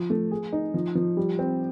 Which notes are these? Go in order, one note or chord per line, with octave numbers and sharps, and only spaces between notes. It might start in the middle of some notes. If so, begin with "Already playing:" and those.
Already playing: F3
A3
G#4
D#4
F3
F3
G3
C4